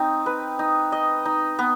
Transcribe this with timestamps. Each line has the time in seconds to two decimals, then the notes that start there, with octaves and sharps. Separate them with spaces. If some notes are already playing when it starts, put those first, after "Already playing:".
Already playing: C4 D#4
0.26 B4
0.59 D#4
0.92 D#5
1.25 D#4
1.59 B3